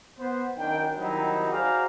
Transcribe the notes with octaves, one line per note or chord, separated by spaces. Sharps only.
B3 C5
F#2 D#3 D4 G5
D#3 F#3 G3 C4 D#4 E4
F#4 G#4 C5 D5 F5 A#5